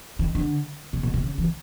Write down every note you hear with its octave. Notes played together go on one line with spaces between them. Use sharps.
D#3
D3
C3
B2
C3
C#3
E3